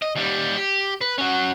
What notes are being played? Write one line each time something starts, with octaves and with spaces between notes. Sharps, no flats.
D#5
D#2 G3
G4
B4
C#4 F#4